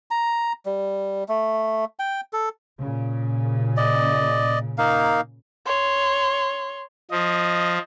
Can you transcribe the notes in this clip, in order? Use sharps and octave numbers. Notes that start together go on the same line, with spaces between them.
A#5
G3
A3
G5
A4
A#2 C#3
D5 D#5
A#3 D#4 F5
C#5 C6
F3 D#5